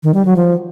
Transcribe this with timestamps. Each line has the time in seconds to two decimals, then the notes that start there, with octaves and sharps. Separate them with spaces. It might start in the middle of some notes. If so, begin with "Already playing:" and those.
0.03 D#3
0.14 G3
0.25 F#3
0.36 F3